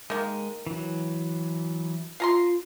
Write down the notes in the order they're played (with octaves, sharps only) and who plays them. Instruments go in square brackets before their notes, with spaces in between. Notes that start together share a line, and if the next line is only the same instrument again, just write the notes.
[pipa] D#3 A#3 [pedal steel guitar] G#3
[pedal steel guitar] E3 F#3
[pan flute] F4 [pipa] F5 A#5 C6